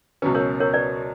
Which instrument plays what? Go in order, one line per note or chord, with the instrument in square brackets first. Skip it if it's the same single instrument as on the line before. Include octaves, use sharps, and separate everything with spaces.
[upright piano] C#2 B2 F#3 C#4 [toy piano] B4
[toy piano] A#4 C#5
A#4 C#5
B4 D5